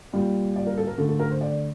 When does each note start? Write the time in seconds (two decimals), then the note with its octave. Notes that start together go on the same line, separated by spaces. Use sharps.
0.13 A#2 G3
0.56 D5
0.67 A#4
0.78 A4
0.87 A#4
0.98 D3 A3 A4
1.09 A4
1.19 A#4
1.30 C5
1.41 D5